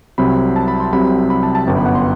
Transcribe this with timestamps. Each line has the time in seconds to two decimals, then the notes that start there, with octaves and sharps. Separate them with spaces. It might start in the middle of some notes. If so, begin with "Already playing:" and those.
0.18 C2 C3 F#3 C4 B5
0.56 A5
0.68 B5
0.80 C6
0.92 C2 C3 F#3 C4 B5
1.30 B5
1.43 A5
1.55 A5
1.67 G1 F#2 F#3 B3 G5
1.76 B5
1.86 F#5
1.95 C6